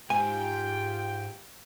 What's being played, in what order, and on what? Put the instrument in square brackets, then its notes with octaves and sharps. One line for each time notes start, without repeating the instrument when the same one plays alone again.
[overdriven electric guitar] G#2 [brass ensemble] F4 G4 G5 [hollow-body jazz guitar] G#5